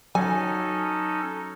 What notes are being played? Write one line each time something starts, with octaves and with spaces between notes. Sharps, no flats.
F#3 C#4 D#4 A4 G#5